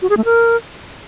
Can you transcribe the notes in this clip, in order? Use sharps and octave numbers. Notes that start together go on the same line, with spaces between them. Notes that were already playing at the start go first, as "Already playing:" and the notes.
F#4
G#4
A3
A#4